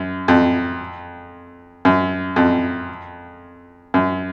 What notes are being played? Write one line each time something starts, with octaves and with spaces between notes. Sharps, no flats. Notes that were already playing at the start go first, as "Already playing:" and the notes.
Already playing: F#2
F2
F#2
F2
F#2